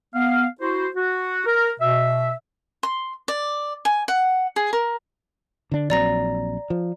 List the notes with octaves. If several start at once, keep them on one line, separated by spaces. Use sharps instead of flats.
B3 F5
E4 F#4 C5
F#4
A#4
B2 E5
C6
D5
G#5
F#5
G#4
A#4
D3 D4
A#1 F#3 C4 D5 A#5 A#6
F3